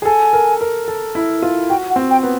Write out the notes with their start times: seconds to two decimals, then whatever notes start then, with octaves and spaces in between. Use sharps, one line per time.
0.02 G#4
0.05 A4 G#5
0.33 A#4
0.61 A#4
0.88 A4
1.15 E4
1.42 F4
1.70 F#4 G5
1.90 F#5
1.96 C4
2.11 G5
2.23 B3